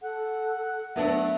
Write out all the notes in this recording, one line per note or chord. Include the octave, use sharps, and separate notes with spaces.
A4 F#5
F#3 A3 B3 D4 E5